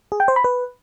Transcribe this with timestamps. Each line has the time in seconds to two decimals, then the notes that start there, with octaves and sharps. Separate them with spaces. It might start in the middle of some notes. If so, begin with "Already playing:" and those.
0.12 G#4
0.20 G5
0.28 C5
0.36 B5
0.44 B4